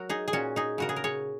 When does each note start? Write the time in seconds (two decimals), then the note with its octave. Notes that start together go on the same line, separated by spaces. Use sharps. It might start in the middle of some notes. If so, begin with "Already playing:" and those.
Already playing: F#3 F#4 A#4
0.09 D#4 G#4
0.28 G#4
0.33 A#2 C#4 F#4
0.56 D#4 G#4
0.78 C#3 F#4 A#4
0.89 G#4
0.96 A#4
1.04 G#4 C#5